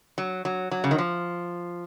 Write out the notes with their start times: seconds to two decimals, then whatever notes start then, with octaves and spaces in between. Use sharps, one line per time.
0.18 F#3
0.45 F#3
0.71 F#3
0.84 C#3
0.91 D#3
0.98 F3